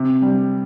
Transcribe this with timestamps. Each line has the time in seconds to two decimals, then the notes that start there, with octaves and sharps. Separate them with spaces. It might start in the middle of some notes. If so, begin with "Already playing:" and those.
Already playing: C3
0.22 G3